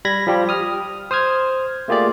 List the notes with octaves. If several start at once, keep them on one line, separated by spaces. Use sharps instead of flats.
G3 B5 G#6 A#6
F3 G3 F4 G4
D#6 F6
C5 D#6 F6 G#6
A3 A#3 F4 G4 G#4 D5